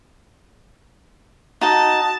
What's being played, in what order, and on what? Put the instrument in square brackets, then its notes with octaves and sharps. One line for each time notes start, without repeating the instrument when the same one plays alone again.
[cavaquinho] D#4 F#4 D#5 [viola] A5